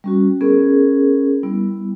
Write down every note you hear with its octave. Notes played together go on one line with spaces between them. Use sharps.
G3 C#4 F#4
B3 C#4 G#4 A#4
G3 B3 E4